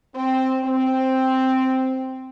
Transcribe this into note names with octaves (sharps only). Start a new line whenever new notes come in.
C4
C4